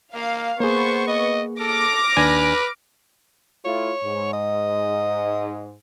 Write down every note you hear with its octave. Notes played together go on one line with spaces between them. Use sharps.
A#3 F5
A#3 B3 G#4 C5 C#6
D#5
A4 D6 F6 A#6
D#2 D4 B4 G#5
A3 E4 F4 C#5
G#2
D#5